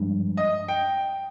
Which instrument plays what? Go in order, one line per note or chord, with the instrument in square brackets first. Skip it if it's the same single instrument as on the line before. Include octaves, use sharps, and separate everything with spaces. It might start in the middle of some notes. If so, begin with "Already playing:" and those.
Already playing: [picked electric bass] G2 F3 G#3
[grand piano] D#5
G5